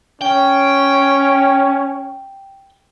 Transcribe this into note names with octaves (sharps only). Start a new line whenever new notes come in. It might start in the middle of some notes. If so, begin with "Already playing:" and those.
C#4 G5